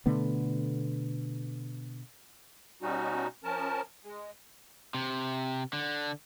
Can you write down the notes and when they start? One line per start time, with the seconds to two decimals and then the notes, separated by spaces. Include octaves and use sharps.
0.06 B2 D3 A3 B3
2.82 B2 G3 C#4 D#4 F#4
3.44 F3 C#4 A#4 A5
4.04 G#3
4.94 C3
5.73 D3